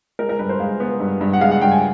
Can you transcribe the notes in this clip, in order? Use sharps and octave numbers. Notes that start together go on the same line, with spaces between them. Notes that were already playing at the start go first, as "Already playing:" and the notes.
G#3 A#4
A#4
G2 B4
C5
G#3 F5
B3
G2
G2
F#5
G#3 F5
F#5
G2 G5
G#5